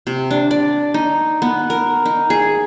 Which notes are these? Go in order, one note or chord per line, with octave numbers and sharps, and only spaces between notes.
C3
D4
D5
D#4
B3
A#4
D#4
G#4